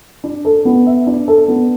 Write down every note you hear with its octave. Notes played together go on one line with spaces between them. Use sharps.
D4
A4
B3
E5
D4
A4
B3